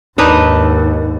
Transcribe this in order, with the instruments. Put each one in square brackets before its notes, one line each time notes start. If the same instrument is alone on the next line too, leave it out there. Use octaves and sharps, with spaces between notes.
[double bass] D#2 G#2 [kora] D4 D#4 B4